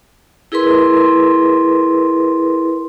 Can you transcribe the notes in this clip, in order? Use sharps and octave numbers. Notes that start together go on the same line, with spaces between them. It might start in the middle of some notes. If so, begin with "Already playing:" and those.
E4 G#4 A#4 B4 C6